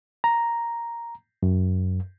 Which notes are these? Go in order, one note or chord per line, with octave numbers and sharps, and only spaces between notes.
A#5
F#2